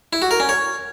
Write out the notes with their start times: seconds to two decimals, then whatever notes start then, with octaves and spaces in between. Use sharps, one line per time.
0.13 E4
0.22 F#4
0.31 A#4
0.40 C#4
0.49 C#5